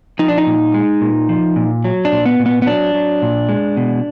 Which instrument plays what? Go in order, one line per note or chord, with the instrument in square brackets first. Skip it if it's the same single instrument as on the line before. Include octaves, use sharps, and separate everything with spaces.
[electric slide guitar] F3 D#4
D4
D#4
A#2
G#3
A#2
F3
A#2
F#3
D4
A#2
B3
A#2
B3
B3
F#3 D4
F#3
A#2
G#3
B2